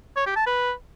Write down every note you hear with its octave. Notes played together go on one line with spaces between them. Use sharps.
C#5
G4
A5
B4